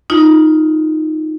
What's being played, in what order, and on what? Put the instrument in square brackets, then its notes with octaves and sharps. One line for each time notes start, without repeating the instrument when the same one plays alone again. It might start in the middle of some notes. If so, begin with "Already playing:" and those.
[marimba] D#4 F4